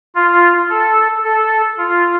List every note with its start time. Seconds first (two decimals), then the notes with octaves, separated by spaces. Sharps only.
0.15 F4
0.70 A4
1.24 A4
1.78 F4